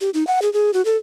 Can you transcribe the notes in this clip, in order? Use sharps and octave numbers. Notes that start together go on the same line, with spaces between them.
G4
D#4
F#5
G#4
G#4
F#4
A4